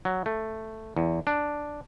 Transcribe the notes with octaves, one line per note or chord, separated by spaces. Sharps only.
F#3
A3
E2
D4